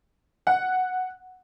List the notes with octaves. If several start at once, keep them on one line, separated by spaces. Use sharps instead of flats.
F#5